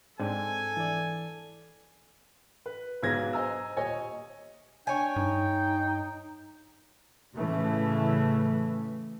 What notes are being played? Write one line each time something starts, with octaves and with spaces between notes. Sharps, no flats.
G#2 C4 D4 A4 G#5
E3 D5
B4
B1 G#2 B4 G#6 A#6
C5 D#5 G#5 A#5 E6
D#1 C#5 D#5 G#5
D4 C#5 G5 G#5
G2 D#4
A2 C#3 E3 A3